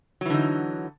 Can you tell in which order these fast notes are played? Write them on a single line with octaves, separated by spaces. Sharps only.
F#3 E3 D3 D#4